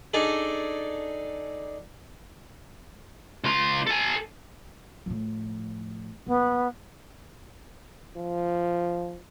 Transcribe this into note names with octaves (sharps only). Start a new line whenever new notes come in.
D4 D#4 G#4 A4
C#2 F4
A4 G#5
A2 F3
F#1 B3
F3